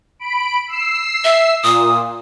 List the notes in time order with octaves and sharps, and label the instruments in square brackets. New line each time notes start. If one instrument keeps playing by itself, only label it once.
[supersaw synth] B5 D7
E6 C7
[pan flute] E5
[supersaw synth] A#2 [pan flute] D#6